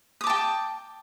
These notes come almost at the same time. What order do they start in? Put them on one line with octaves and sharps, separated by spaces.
D#6 D6 A5 G5